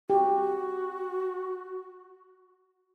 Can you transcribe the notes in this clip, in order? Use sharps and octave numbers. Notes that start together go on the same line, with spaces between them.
F#4 G4